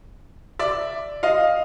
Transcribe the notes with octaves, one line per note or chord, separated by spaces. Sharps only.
D5 E5
D#5 F5